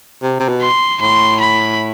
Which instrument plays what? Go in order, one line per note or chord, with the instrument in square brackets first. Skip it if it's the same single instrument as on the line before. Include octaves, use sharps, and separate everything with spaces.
[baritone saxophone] C3
C3
B2
[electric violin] C6
[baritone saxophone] A2 [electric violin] C6
[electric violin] B5